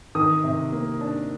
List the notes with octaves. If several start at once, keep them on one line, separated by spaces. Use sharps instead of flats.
D#3 D#6
C3
A#3
D4